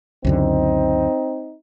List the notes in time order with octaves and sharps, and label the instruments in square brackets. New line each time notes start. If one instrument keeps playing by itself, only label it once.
[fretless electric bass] C#2 F#2 D3 [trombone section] C4 D#4